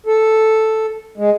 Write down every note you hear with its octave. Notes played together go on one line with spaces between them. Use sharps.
A4
G#3